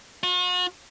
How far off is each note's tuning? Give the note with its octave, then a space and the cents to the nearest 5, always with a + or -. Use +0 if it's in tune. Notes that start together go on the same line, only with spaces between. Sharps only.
F#4 -45